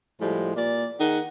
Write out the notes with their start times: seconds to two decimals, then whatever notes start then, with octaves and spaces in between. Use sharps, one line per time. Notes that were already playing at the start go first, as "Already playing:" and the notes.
0.20 A2 F3 G3 G#3
0.56 A#2 D5
1.00 D#3 G#4 D#5 F#5